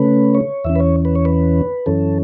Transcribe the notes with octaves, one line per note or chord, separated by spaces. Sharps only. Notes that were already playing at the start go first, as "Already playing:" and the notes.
Already playing: C#3 A3 C#4 B4
C#5
E2 E3 C#4 E5
B4
C#5
B4
C#5
B4
F#2 E3 C#4 A4